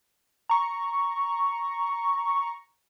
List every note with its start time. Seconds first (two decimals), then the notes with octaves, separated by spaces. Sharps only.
0.49 A#5 C#6